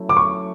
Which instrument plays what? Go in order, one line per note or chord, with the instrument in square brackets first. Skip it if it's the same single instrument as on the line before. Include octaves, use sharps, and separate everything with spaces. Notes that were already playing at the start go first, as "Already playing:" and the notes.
Already playing: [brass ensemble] F#3 A3 C#4 E4
[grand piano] D6
C#6